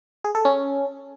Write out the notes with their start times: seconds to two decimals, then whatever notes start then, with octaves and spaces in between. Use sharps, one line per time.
0.24 G#4
0.35 A4
0.45 C#4